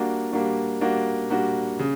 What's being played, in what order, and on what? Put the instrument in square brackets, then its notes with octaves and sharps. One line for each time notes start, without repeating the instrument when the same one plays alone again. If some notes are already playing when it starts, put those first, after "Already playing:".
Already playing: [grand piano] G3 A#3 D4 F#4
G3 A#3 D4 F#4
G3 A#3 D4 F#4
G3 A#3 D4 F#4
C#3